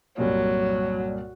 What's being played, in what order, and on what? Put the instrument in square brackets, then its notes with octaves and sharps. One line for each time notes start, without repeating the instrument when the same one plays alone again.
[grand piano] C2 G2 A#2 [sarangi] F#3